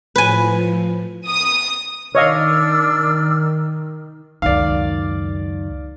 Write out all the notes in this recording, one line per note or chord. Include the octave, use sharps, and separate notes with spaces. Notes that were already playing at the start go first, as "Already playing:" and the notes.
A2 F3 B4 G#5
D#6
D#3 D4 C#5 D#5 F5 E6 F6
C#2 F#2 D#3 D5 F5